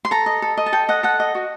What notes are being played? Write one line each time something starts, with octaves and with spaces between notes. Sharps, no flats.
C6
A4 A#5
D#5
A4
D#5
A5
A4 G5
D#5 F#5
A4 F#5
D#5
F#4